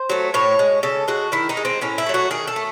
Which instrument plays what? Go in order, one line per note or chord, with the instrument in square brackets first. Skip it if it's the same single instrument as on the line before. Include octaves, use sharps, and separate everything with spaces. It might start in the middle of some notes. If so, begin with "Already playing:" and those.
Already playing: [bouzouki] C5
F#3 A3
A2 C#5
G#3
C#3 A4
G#3 F#4
D#3 E4
D#4
G#3
C4
A2 C#4
E4
F#3 A3
F#4
D#3 G#4
A4
A3